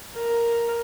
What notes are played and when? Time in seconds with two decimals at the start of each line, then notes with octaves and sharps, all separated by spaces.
0.15 A#4